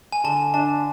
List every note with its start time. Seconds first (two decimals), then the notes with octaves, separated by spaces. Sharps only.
0.12 G#5
0.24 D3 A5
0.54 D4 A5